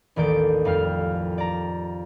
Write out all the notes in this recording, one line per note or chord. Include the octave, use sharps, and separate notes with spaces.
A1 D#2 D#3 D5 G6 D7
F2 G3 F5 F6
D5 A#5